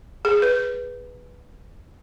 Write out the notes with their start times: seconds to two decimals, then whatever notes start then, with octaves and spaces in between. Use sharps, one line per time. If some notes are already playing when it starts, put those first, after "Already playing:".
0.25 G#4
0.42 B4